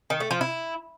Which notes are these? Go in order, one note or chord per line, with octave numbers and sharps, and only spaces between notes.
D#3
A3
F3
E4